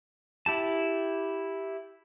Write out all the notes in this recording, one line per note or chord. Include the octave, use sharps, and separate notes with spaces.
E4 G4 A5